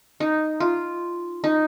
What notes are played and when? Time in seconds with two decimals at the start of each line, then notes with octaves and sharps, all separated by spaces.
0.20 D#4
0.60 F4
1.44 D#4